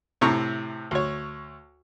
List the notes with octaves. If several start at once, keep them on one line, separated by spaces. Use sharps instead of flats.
A2 C3 A#5 C#6
D2 C#5